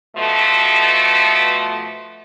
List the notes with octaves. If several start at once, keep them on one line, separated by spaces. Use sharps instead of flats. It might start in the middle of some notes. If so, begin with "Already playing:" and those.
B2 F3 A3